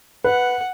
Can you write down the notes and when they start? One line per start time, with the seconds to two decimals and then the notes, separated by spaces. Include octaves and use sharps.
0.24 B4 F#5